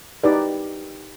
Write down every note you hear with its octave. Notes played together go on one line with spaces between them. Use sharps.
D#4 G4 B4 D5